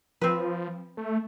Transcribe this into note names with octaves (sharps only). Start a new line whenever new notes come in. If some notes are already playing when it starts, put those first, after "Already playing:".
F3 C4 B4
A3